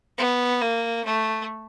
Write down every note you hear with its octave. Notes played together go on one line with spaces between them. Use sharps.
B3
A#3
A3